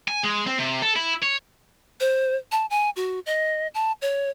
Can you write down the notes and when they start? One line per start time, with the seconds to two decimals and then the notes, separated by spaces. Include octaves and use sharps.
0.08 G#5
0.24 G#3
0.46 C4
0.59 C3
0.82 A4
0.96 E4
1.22 C#5
2.00 C5
2.52 A5
2.70 G#5
2.96 F#4
3.26 D#5
3.74 A5
4.02 C#5